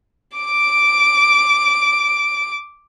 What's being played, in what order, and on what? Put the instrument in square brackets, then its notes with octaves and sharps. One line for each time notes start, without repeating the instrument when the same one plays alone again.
[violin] D6 D7